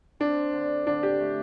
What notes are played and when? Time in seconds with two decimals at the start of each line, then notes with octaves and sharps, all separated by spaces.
0.20 C4 D4
0.53 D3
0.87 D3 D4
1.03 G4
1.20 A3